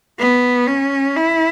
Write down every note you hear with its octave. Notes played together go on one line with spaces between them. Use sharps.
B3
C#4
E4